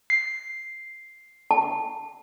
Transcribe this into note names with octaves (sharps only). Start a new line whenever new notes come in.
C7
A5